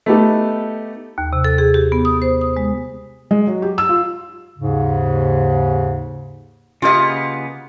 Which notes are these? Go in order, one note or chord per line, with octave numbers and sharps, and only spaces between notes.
A3 B3 D#4 G4 A4
D#2
C3
A4
G#4
G4
B3
D#6
C5
D#6
G#3
G#3
F#3
G4
E6
F4
D#2 G#2 C#3
C#3 A#3 B3 F4 G4 D#5